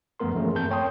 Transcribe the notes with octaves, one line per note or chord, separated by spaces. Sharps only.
F#2 F3 A3 B3 A#4 C6
E3 F3 A3 A#3 C#4 G#4
G2 C4 A#4 A5 G6
C#5 G5 A5 C6 D#6